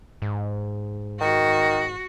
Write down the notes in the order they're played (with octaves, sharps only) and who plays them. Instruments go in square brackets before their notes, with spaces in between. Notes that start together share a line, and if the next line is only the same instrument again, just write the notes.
[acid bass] G#2
[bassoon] D#3 [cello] F#4